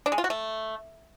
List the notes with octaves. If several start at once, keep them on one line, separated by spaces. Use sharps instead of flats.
D4
G#3
F4
F#4
A3